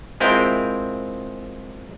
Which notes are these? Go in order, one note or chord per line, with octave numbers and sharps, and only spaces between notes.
G#3 C4 E4 F4 A#4 G5